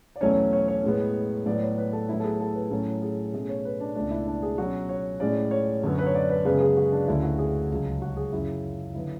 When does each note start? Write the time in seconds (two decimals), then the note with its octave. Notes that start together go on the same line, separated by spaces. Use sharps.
0.16 D5
0.21 E2 B2 F#3 A3 C#4 C#5
0.53 C#5
0.68 C#5
0.84 A2 G#3 B3
1.46 A2 F#3 B3 D5
1.62 C#5
1.78 B4
1.93 A4
2.08 A2 F#3 B3 E4
2.20 A4
2.24 G#4
2.40 A4
2.55 B4
2.70 A2 F#3 C#4 A4
3.02 G#4
3.33 B2 A3 C#4 G#4
3.49 C#5
3.65 B4
3.80 D4
3.95 C#2 B2 A3 C#4 D4
4.11 E4
4.27 D4
4.42 G#4
4.58 B2 F#3 C#4 F#4
4.89 C#5
5.20 A2 G#3 C#4 D5
5.51 C#5
5.83 F#2 D3 F#3 B3
5.98 B4
6.06 C#5
6.14 D5
6.30 B4
6.45 F#2 C#3 G#3 B3 B4
6.61 G#4
6.77 F#4
6.92 D4
7.08 D2 D3 A3 C#4 E4
7.23 F#4
7.39 G#4
7.70 C#2 C#3 F#3
8.02 F#4
8.17 G#4
8.32 F#2 C#3 F#3 E4
8.94 D3 F#3 B3 E4